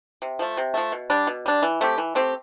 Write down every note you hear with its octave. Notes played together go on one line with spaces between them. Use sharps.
C3
F3 A3
C3
F3 A3
B2
G3 D4
B2
G3 D4
E3
A3 C4 G4
E3
A3 C4 G4